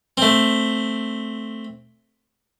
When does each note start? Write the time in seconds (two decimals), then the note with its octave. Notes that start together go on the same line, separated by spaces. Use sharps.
0.17 A3 C4